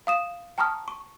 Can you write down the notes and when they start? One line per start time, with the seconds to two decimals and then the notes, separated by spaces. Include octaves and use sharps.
0.07 F5 D#6 E7
0.58 G5 A5 A#5 C#6 D#6 F6
0.88 C#6